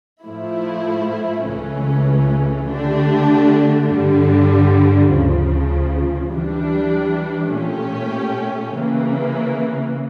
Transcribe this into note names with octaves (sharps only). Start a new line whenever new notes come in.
A2 F3 A3 E4
C#2 C#3 E3 A3 C#4
D3 A3 D4 G4
G2 D3 G3
D2 C#3 F3
E3 G3 D4
A#2 A3 C#4 G4
C#3 E3 A#3